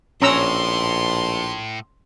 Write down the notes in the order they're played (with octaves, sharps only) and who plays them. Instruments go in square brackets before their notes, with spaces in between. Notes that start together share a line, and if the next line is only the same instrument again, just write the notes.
[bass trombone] A#1 [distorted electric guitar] A2 [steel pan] C#4 A#5 E6 [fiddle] C6